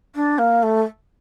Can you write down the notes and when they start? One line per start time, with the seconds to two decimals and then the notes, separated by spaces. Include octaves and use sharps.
0.15 D4
0.38 A#3
0.63 A3